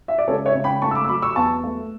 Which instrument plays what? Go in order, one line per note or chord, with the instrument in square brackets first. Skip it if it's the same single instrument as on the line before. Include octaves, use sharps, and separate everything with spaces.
[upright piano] E5
D5
C#2 A4 C#5
C#5 E5
C#2
G5 B5
A3 A5 C#6
E6
B5 D6
E6
F#3 B5 D6
C#6 E6
E2 A5 C#6
A3